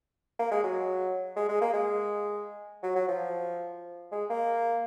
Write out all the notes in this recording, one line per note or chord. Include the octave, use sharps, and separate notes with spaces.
A#3
G#3
F#3
G#3
G#3
A#3
G#3
F#3
F#3
F3
G#3
A#3